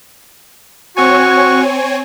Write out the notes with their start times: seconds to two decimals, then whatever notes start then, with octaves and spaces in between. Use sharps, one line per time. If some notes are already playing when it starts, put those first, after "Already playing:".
0.97 C4 F#4 C#5 G#5 C#6